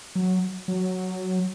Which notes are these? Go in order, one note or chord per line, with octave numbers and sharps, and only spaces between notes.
F#3
F#3